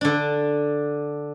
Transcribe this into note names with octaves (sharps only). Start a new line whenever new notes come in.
D3 D4